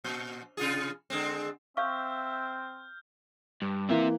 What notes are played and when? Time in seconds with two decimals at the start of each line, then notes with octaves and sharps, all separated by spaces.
0.04 A#2
0.57 C3 F4 G#4
1.10 D3 G#3 C4
1.77 C4 E5 F5 C#6 F6 G6
3.62 G2
3.90 E3 A#3 C4 E5